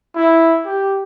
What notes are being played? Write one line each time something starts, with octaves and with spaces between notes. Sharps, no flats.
E4
G4